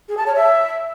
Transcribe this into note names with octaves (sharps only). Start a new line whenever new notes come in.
G#4
A5
C#5
E5